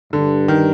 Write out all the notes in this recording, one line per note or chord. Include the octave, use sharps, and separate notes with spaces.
G2 D3
D#3